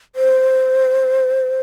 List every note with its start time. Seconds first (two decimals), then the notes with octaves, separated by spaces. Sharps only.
0.16 C5